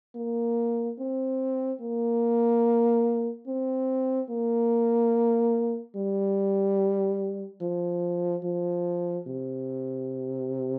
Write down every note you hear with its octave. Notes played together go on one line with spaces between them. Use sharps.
A#3
C4
A#3
C4
A#3
G3
F3
F3
C3